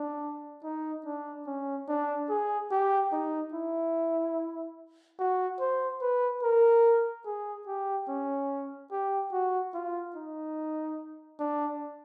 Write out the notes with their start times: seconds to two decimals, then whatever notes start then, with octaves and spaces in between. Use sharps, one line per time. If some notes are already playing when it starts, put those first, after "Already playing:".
Already playing: D4
0.64 D#4
1.05 D4
1.47 C#4
1.88 D4
2.29 G#4
2.71 G4
3.12 D#4
3.54 E4
5.19 F#4
5.60 C5
6.02 B4
6.43 A#4
7.26 G#4
7.67 G4
8.08 C#4
8.91 G4
9.32 F#4
9.74 F4
10.15 D#4
11.39 D4